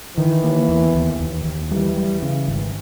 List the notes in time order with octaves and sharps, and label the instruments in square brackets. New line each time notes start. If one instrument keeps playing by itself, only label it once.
[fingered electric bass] D#3 [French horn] E3
[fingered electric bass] A#3
E2
D#2
D#2
D#2
[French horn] E3 [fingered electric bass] G3
[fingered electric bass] G3
C#3
G#1